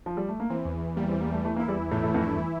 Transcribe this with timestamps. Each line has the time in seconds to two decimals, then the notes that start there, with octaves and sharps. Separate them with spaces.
0.06 F3
0.17 G3
0.29 A3
0.40 A#3
0.50 E3 C4
0.65 E2
0.81 E2
0.96 G3 A#3
1.09 C4
1.12 E3
1.21 A#3
1.28 E2 A3
1.45 E3 A3
1.56 A#3
1.59 E4
1.68 G3
1.75 E2
1.91 A2 A3
2.03 A2
2.07 E3
2.14 F2
2.22 G2 E4
2.38 E3